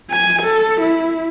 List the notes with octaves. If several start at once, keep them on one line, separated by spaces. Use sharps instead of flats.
G#5
A4
E4